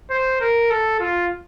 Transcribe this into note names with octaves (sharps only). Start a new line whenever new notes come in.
C5
A#4
A4
F4